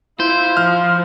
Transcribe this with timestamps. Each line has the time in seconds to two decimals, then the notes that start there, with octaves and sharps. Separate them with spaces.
0.20 E4 F4 C5
0.57 F3 F6